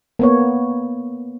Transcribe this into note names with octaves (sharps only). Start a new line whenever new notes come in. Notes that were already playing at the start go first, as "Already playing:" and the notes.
A#3 B3 C#5